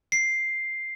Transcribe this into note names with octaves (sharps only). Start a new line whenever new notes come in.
C7